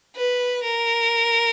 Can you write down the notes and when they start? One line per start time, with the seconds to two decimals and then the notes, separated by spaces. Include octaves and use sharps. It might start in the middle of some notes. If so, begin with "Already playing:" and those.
0.16 B4
0.64 A#4